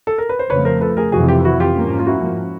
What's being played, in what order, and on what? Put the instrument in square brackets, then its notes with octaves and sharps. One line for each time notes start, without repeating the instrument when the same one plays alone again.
[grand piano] A4
A#4
B4
C5
[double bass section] F2 C#3 F3 A3 [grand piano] B4 C#5
[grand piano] A#4 C5
A4 B4
G#4 A#4
[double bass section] F2 C3 E3 [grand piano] F#4 G#4
[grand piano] F4 G4
E4 F#4
F4 G4
[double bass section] G#2 F3 A#3 C#4
[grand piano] F4
E4 F#4